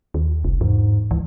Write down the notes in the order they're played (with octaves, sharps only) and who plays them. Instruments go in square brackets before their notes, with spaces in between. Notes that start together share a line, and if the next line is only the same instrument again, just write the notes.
[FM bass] D#2
[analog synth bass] F1 [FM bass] C2
[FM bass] E2 [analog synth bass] G#2
[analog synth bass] C#2 [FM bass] E3